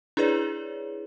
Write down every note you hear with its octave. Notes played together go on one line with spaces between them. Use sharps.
D4 E4 G#4 B4 C#5 D5